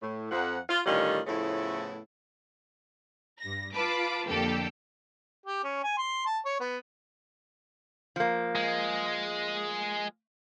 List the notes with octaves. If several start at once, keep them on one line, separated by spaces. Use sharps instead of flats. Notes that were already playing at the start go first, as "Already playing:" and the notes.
A2
F2 F3 F#5
F4
A2 D3 D#3 G3 C#4 F4
A2 C#3 F3 A3 B3 E4
G2 A#6
F4 B4 A5 D6
F2 D3 A#3 G4 A4 G5
G4
C#4
G#5
C6
A5
C#5
B3
F3 A#3
G#3